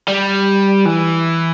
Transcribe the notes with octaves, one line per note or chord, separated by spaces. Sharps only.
G3
E3